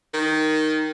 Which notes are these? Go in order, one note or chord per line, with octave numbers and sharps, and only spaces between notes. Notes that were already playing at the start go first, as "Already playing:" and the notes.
D#3